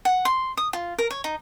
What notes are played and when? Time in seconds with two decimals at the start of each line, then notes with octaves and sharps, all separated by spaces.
0.05 F#5
0.25 C6
0.57 D#6
0.73 F4
0.99 A#4
1.11 C#5
1.24 D#4